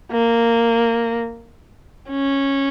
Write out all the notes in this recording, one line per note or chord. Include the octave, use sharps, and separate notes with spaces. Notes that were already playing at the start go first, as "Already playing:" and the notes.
A#3
C#4